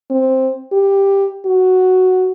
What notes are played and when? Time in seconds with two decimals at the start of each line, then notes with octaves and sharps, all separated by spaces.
0.10 C4
0.73 G4
1.46 F#4